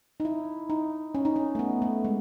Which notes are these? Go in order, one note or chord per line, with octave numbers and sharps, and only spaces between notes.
D#4
E4
D#4
C#4
D#4
C#4
A3
B3
A3
G#3